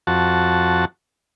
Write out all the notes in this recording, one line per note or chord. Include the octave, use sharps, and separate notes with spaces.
F2 F#4 A5